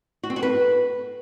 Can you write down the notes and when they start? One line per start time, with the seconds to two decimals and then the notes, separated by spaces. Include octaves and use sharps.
0.23 F#4
0.30 C4
0.36 F#4
0.43 B4